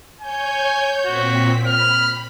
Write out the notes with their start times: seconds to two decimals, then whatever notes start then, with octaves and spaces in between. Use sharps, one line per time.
0.21 C#5 G#5 G6
1.05 A#2 C4 F#4 B6
1.67 B5 F6